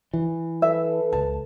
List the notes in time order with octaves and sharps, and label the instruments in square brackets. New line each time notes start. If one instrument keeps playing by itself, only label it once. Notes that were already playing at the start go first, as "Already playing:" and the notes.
[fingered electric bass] E3
[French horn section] A4 B4 [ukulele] E5
[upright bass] C#2 [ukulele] A5